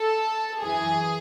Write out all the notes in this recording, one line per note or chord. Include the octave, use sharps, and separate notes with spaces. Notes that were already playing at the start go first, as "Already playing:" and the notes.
Already playing: A4
F#2 E3 G#4